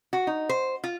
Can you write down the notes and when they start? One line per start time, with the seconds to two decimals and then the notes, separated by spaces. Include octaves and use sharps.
0.13 F#4
0.27 D#4
0.49 C5
0.84 F4